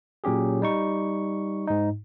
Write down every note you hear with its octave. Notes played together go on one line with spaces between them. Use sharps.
A#2 F#3 C#4 G4 G#4
G3 D#4 C#6
G#2 D#4